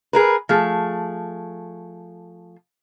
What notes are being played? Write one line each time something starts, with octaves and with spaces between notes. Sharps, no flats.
G#4 A#4 B4
F3 A3 G#4